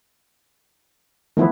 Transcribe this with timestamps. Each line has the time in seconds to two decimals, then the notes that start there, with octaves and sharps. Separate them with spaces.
1.37 D#3 F3 A3 B3 E4